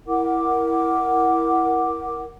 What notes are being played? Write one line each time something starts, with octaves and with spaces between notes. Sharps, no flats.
E4 A#4 F#5 D6